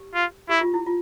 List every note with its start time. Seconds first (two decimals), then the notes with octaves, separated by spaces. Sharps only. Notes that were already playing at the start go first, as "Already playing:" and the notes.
Already playing: G4
0.14 F4
0.49 E4 G4
0.61 F4
0.74 E4
0.86 F4